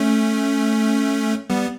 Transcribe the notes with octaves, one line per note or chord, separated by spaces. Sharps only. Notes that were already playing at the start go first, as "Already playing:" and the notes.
Already playing: A3 C#4
G3 B3